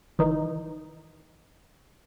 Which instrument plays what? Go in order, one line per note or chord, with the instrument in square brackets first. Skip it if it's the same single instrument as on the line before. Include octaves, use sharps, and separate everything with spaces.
[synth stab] G1 D#3 E3 D#4